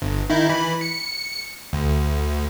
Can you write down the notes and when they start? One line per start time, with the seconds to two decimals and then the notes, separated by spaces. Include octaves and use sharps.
0.02 G1
0.30 D#3 D#4 E4
0.49 E3 B5
0.81 C#7
1.73 D2